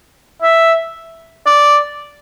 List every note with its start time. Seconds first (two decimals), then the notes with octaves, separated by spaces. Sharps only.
0.42 E5
1.46 D5